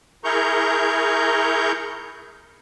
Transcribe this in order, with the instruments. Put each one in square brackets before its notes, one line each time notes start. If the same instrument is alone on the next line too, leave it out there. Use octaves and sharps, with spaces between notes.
[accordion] E4 G#4 A#4 A#5 C#6 G6